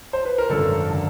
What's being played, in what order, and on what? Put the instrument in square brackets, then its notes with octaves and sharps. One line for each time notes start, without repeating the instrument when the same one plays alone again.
[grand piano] C5
B4
A#4
G#1 F#2 D3 A4
D3